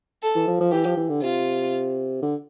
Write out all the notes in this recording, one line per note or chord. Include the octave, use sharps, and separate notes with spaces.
A4
E3
F3
F3
E3 G4
F3
E3
D3
C3 F4
D3